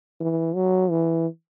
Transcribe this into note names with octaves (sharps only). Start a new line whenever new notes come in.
E3
F#3
E3